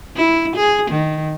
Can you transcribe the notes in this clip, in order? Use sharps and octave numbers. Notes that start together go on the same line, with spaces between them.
E4
G#4
D#3